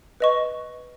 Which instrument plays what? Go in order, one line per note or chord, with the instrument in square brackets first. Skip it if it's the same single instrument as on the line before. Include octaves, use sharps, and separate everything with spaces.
[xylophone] B4 D#5 C#6